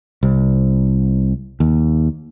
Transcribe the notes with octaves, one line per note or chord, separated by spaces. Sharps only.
C2
D#2